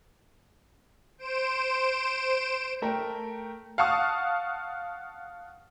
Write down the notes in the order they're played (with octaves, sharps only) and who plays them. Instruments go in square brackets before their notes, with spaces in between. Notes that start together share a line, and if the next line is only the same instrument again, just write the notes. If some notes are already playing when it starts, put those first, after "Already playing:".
[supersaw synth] C5 D7 E7
[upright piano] A3 A#4 G5
[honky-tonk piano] F5 F#5 A5 C#6 D#6